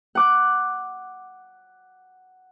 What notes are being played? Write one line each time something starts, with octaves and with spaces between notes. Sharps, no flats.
F#5 D6 F#6